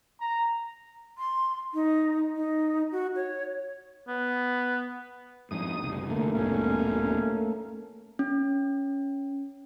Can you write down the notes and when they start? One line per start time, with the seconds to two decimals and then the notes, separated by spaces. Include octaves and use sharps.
0.20 A#5
1.18 C6
1.74 D#4
2.36 D#4
2.92 F#4
3.16 C#5
4.08 B3
5.51 F2 G#2 D#6
5.83 F#1 C2
6.10 F1 D3 A3 A#3
6.34 D#1 G#2 B2 C#4
8.19 C#4